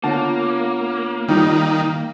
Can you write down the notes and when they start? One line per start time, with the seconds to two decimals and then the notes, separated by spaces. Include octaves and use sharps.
0.04 D3 A#3 B3 F4 C#5 A5
1.28 D#3 G3 D#4